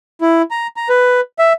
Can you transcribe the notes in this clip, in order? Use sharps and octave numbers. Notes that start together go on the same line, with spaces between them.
E4
A#5
A#5
B4
E5